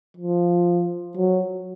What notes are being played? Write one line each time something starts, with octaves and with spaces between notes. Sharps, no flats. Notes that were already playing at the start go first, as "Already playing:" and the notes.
F3
F#3